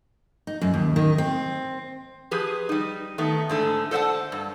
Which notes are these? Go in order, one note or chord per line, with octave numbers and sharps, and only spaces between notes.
D#4
F#2
D#2
D#3
C4
F3 G4 G#4 B4
G3 D#4
D#3 A3 B3
G#2 D3 A3 A4
A4 C5 D5 E5 F#5 A5
G2